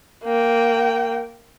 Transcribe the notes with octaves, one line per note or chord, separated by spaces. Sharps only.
A#3 G5